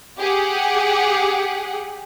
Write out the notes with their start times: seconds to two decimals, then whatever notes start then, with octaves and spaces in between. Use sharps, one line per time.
0.18 G4 G#4 F#5